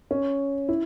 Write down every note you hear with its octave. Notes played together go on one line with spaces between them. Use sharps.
C#4
E4